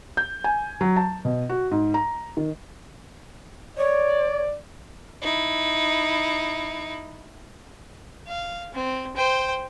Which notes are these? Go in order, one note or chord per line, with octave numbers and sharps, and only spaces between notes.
G6
G#5
F#3
A5
B2
F#4
G#2
A#5
D#3
C#5 D5
D#4 E4
F5
C4
C5 G5